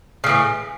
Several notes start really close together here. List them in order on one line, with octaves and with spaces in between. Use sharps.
C#3 A2 E3